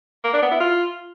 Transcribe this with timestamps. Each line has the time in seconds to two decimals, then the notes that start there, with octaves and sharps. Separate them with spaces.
0.24 A#3
0.33 D4
0.42 B3
0.51 E4
0.60 F4